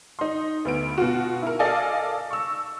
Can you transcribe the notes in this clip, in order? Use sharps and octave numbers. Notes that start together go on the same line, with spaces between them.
D#4 C6
D2 B3 D7
B2 F4 F#4
E4 A#4
A4 D5 D#5 F5 G#5
C#6 E6